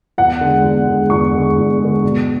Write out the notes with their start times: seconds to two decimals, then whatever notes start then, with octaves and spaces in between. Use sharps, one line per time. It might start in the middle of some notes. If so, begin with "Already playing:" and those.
0.18 E2 F#5
0.41 D3 G#3
0.64 E2
0.88 D3 G#3
1.10 E2 C#6
1.34 D3 G#3
1.57 E2
1.80 D3 G#3
2.03 B2